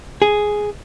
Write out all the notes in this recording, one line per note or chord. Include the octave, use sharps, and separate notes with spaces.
G#4